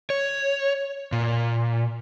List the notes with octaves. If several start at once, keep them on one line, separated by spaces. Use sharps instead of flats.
C#5
A#2